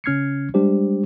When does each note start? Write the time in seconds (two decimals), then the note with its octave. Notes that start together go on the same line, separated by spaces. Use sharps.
0.04 C#3 C#4 F6 G#6 C7 C#7
0.54 G3 G#3 D4 G4 C5